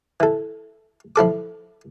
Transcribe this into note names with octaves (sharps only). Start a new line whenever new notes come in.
E3 A4
F3 E4 A4 D6